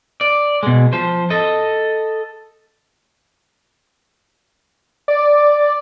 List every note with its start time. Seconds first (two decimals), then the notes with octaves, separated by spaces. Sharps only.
0.21 D5
0.63 B2 G#3
0.93 F3 C5
1.30 A4 D#5
5.08 D5